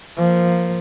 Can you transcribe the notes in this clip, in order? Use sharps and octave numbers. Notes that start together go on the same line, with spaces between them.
F3 A#3